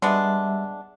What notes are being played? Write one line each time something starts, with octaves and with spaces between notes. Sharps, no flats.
G3 G#3 B3 D4 E5